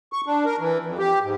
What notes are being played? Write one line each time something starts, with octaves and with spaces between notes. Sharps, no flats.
C#6
D4
A#4
E3
F2
G4
G#2